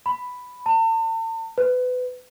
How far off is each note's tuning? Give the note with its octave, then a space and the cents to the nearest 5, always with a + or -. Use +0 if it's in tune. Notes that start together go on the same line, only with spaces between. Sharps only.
B5 +5
A5 +40
B4 +25